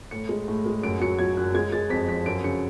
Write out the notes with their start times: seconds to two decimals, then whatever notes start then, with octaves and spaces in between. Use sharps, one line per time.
0.11 A2 C#7
0.29 G#3
0.48 A2
0.66 G#3
0.83 F#2 D7
1.00 F#3 C#7
1.19 F#3 G#6
1.37 F#2 F#6
1.54 G#3 G#6
1.72 G#3 A6
1.90 F2 B6
2.08 F3 B6
2.26 F#2 D7
2.44 C#3 C#7